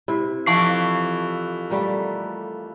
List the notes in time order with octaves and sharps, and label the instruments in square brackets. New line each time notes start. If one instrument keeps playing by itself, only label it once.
[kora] C3 E4
[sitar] F2 E3 F3 [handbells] A5 C#6 C7
[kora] G3 A3 A#3